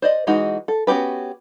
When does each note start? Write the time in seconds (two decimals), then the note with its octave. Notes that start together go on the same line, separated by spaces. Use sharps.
0.02 C5 D5 D#5
0.27 E3 G#3 D#4 F#4
0.68 A4
0.87 B3 C#4 F#4 G4 B4